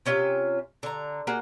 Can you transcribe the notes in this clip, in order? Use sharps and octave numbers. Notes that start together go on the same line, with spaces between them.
C3 C#4 F4 E5
D3 A#5
A#3 F#4 G#4